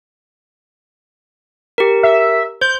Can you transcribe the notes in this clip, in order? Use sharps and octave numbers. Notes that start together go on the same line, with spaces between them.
G4 A#4
E5
C5 G6